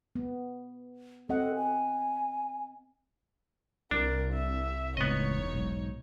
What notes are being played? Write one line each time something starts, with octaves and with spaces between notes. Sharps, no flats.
B3
C4 A4 D#5 F#5
G#5
C2 D4 A#4
E5
E1 C#2 A2 B3 C4 D#4 C#5 D#5
B1 G#2